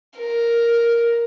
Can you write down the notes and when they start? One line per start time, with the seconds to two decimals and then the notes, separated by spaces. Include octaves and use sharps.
0.18 A#4